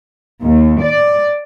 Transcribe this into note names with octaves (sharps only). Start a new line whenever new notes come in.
D#2
D5